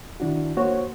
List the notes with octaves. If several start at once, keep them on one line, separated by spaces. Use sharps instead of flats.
D#3 D4 E4 F#4
A#3 F#4 C5 C#5